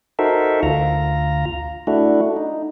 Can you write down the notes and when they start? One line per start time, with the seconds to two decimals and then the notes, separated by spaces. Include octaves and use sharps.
0.19 D#4 F#4 A4 A#4 C5 E5
0.63 D2 F4 A#5
1.87 A3 D4 E4 F#4
2.36 D#4